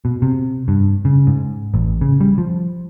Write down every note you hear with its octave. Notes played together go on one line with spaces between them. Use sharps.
B2
C3
G2
C#3
G#2
A1
C#3
G3
F3